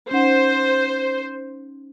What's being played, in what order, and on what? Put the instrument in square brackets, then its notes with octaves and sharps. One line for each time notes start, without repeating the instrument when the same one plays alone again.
[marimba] C#4 D#4 F#5 [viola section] C5